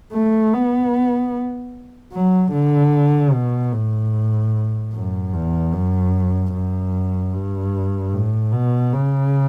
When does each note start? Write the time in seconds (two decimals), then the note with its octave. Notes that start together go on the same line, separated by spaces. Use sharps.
0.13 A3
0.53 B3
2.13 F#3
2.53 D3
3.33 B2
3.73 A2
4.93 F#2
5.33 E2
5.73 F#2
6.53 F#2
7.33 G2
8.13 A2
8.53 B2
8.93 C#3